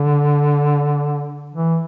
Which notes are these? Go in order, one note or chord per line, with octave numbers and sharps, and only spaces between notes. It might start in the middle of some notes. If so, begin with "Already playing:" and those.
Already playing: D3
E3